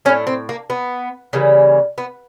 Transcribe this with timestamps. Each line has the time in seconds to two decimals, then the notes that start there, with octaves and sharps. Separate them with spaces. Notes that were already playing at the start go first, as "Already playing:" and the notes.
0.05 A2 F#3 A3 C#4
0.27 C4
0.49 A#3
0.70 B3
1.33 C#3 E3 G3 A#3
1.98 B3